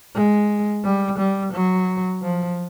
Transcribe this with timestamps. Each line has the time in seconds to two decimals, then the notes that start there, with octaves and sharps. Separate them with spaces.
0.15 G#3
0.84 G3
1.18 G3
1.53 F#3
2.22 F3